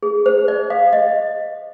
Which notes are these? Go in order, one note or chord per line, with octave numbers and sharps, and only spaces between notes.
G#4
C5
D5
F5
D#5